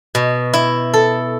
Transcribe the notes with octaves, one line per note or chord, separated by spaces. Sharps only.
B2
E4
A4